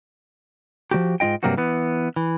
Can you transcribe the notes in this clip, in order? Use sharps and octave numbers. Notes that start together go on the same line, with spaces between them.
F3 F#3 F#4 G4
G#2 A#3 F4 D#5 G5
G2 C3 F#3 A#3 C4 F#4
E3 B3
E3